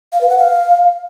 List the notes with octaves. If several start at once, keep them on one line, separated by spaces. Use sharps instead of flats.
F5
B4
F#5
F5